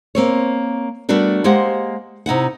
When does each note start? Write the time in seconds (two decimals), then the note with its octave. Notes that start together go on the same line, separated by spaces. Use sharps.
0.15 A#3 C4 C#5
1.09 G3 A3 B3 D4 F#4 A#4
1.44 G#3 A#3 G4 C5 F#5
2.26 C3 D#4 E4 F#5